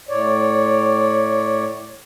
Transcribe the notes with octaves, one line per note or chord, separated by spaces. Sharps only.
A2 C#5 D5